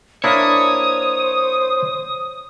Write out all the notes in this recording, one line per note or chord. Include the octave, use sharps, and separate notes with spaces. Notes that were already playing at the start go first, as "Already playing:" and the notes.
A#3 D4 E4 C5 C#5 D#6